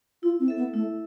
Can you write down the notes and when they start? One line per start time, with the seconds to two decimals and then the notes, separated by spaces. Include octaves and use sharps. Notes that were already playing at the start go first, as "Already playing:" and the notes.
0.23 E4 F4
0.40 C4
0.48 A4 E5
0.57 B3
0.73 A3 E4